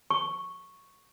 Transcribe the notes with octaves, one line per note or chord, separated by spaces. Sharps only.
C#6